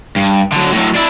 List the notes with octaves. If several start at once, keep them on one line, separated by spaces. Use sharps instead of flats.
G2
D3 F#3
A2 F#3
D4 E4